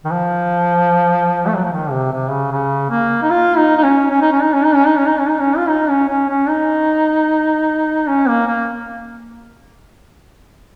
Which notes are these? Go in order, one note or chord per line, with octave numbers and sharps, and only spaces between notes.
D#3
F3
A3
F#3
F3
D#3
C3
C3
C#3
C#3
A#3
D#4
F4
D#4
D#4
C#4
C#4
D#4
C#4
D#4
C#4
D#4
C#4
D#4
C#4
D#4
C#4
D#4
C#4
F4
D#4
C#4
C#4
C#4
D#4
C#4
A#3
A#3